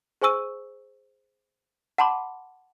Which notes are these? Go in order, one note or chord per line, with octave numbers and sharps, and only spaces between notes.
G#4 C5 G#5 C#6 E6 D#7
F#5 A5 B5 C6 D6